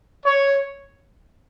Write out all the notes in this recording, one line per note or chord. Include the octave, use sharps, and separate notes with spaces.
C#5